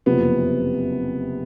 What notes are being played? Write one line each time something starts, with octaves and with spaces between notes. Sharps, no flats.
F#1 F2 C3 F3 B3